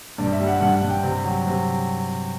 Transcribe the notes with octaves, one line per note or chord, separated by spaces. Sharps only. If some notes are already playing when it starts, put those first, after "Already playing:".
G2 D5
E5
G3
F#5
G2 F#5
F#5
G2
G5
C3
F#3
C3